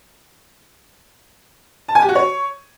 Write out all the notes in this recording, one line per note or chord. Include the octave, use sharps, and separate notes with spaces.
A5
G#5
G4
F#4
C#5